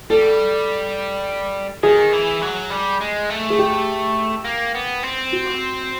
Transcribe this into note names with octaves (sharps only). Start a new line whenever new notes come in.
G3 A4
D#3 G#4
E3
F#3
G3
G#3
A3
G#4
G4
A#3
B3
C4
F#4